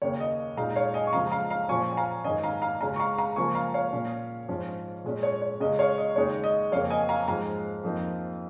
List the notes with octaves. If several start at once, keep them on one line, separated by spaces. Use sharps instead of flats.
D#2 C#3 A#3 C#5
D#5
A#2 G#3 D#4 F5 A#5
C#5 F5
D#5 G#5
C#6
C#2 C#3 F3 G#3 F5 A#5
F5 A#5
F5 A#5
A#2 F3 C#4 G#5 C#6
G#5
F5 A#5
G#2 D#3 C#4 D#5 G#5
F5 A#5
F5 A#5
C#2 C#3 G#3 C#4 F5 A#5
C#6
F5 A#5
F5 A#5
C#2 C#3 F3 A#3 G#5 C#6
F5 A#5
C#5 F5
A#2 A#3 C#4
G#2 F3 C#4
A#2 G#3 C#4
C#5
C#5
C#2 C#3 G#3 C#4 D#5
C#5 F5
D#5
D#2 C#3 G#3 D#4 C#5
D#5
F2 C#3 A#3 C#5 F5
D#5 G#5
F5 A#5
G#2 F3 G#3 F5 A#5
F2 F3 A#3 D#4